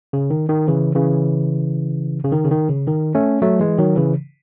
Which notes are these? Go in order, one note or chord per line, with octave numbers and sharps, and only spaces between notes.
C#3
D#3
D#3
C#3 E3
C#3 E3
C#3
D#3
C#3
D#3
C#3
D#3
A3 C#4
F#3 A3
E3 G#3
D#3 F#3
C#3 E3